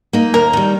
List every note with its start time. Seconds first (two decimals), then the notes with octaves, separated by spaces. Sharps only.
0.13 A#3 D#4
0.34 D#2 A#4
0.53 D#3 G3